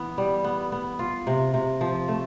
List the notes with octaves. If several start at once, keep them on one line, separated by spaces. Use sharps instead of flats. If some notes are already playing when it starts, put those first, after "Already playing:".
Already playing: E3 B3
G3
B3
B3
F4
C3
C3
F3
A3